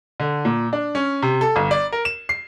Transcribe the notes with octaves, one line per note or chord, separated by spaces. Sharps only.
D3
A#2
D4
C#4
C3
A4
G1
D5
A#4
E7
C7